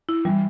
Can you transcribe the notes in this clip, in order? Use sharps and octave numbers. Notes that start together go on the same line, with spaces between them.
E4
E3 G3